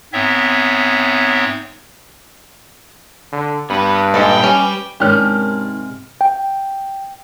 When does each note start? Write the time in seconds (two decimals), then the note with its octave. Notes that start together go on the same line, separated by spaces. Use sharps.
0.13 G#2 B3 C4 C#5 E5
3.33 D3
3.70 G2 B3 B4
4.14 A#2 G#3 D#4 A4 B4 E5 F#5 G5
4.44 G3 C#4
5.00 G#2 C3 D#3 G#3 C#4 D4 G4 F6
6.21 G5